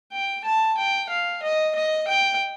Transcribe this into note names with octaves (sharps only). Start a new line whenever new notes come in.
G5
A5
G5
F5
D#5
D#5
G5